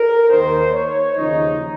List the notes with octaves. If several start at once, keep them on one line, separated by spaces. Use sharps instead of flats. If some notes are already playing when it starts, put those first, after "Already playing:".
Already playing: A#4
D#2 D#3 C5
C#5
D#2 C#3 F3 D#4